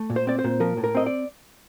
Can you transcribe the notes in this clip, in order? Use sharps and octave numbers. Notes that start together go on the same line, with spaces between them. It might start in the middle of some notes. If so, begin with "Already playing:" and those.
Already playing: A3
A#2
C5
C4 D5
C5
A#2
F3 A#4
A2
A#4
C4 D#5
D5